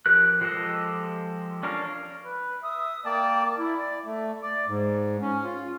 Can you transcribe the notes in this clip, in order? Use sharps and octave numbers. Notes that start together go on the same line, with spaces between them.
F3 G4 A#4 F#6
F3 G#3 G4 A4 D#5
C#4 D4 A#4 F5
B4
E5 D#6
A#3 D5 G5 A5
E4
D5
A3
D5
G#2
C#4
F4